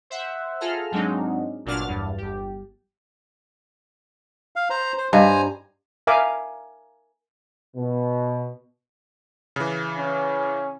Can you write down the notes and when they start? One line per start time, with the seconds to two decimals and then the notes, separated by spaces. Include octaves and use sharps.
0.10 C5 E5 F#5
0.61 F4 G#4 A4 A#5 F6
0.91 G#2 F#3 G#3 C4 D4 D#4
1.65 G1 A#2 F#3 D4 F6 A6
1.88 E2 G2
2.18 G1 G4
4.56 F5
4.70 C5 A#5
4.98 C5
5.13 G2 C5 D#5 F5 G#5 A#5
6.07 A#4 E5 F5 G#5 D6
7.76 B2
9.56 C#3 E3
9.97 C#4